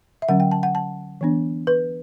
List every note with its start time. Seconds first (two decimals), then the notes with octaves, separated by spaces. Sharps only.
0.22 E5
0.28 D3 F#3 C#4 F#5
0.40 G5
0.51 A5
0.63 F#5
0.75 A5
1.21 E3 B3 D4
1.67 B4